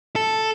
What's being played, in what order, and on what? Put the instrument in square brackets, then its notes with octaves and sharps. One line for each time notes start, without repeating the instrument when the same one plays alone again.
[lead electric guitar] A4